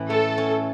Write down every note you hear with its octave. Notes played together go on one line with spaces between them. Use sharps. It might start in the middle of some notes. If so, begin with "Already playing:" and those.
Already playing: A2 E3 C#4
A3 A4
C#4